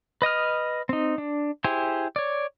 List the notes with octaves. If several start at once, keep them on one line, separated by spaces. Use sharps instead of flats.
B4 D#5 D#6 F6
C4 D#4
D4
E4 G4 G#4 C5 G#5
C#5 D5